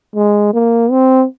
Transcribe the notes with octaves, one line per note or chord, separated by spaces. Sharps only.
G#3
A#3
C4